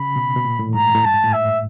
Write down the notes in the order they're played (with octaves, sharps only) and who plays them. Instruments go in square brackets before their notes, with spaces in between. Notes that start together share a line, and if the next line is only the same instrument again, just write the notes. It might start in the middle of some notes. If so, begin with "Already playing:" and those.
Already playing: [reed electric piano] C#3 [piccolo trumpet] B5
[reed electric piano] B2
B2
A#2
A2
[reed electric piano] G#2 [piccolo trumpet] A#5
[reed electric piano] A2
[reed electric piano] G2 [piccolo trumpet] A5
[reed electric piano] G#2
A2
[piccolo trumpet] E5